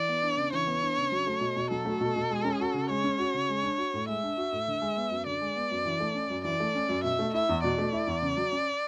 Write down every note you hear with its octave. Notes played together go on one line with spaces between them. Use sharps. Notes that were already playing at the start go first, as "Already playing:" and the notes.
Already playing: E3 D5
B3
D4
C#3
E3 C#5
B3
D4
C#3
F#3
A3
B2
B2
F#3 A4
A3
B2
B2
G#3
C#4
F#4
C#3
G#3 C#5
C#4
F#4
C#3
G#3
D4
F#4
A2
G#3 E5
D4
F#4
A2
D3
G#3
B3
F#2
D3 D5
G#3
B3
F#2
E3
A3
C#4
F#2
E3 D5
A3
C#4
F#2
B2 E5
A3
E4 E5
E2
B2 D5
A3
E4
E2
C#3
F#3
C#4